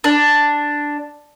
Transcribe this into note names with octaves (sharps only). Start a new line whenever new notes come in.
D4